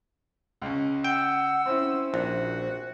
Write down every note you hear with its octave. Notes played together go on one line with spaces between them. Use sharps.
C#2 C#4
F#5 G5 E6
C4 C#4 E4 C5
A#1 F#4